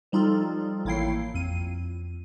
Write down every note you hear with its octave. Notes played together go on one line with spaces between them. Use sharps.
F3 G3 D#4 F4 A4
A1 A#3 E4 C#5 G5 C7
F2 D#7